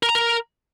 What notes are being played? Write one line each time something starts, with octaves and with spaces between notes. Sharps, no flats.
A#4
A#5
A#4